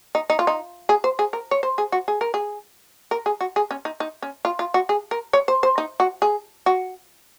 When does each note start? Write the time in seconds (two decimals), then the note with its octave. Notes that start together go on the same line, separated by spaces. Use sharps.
0.15 D#4
0.30 D#4
0.39 F4
0.47 D#4
0.89 G#4
1.04 C5
1.19 G#4
1.33 A#4
1.51 C#5
1.63 C5
1.78 G#4
1.92 F#4
2.08 G#4
2.21 A#4
2.34 G#4
3.11 A#4
3.26 G#4
3.41 F#4
3.56 G#4
3.71 C#4
3.85 D#4
4.00 D#4
4.22 C#4
4.45 F4
4.59 F4
4.74 F#4
4.89 G#4
5.11 A#4
5.33 C#5
5.48 C5
5.63 C5
5.78 D#4
6.00 F#4
6.22 G#4
6.66 F#4